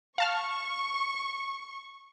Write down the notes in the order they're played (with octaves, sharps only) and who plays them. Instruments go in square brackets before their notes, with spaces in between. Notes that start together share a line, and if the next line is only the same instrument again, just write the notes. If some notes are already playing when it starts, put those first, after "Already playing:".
[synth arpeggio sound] F5 A5 F6 [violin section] C#6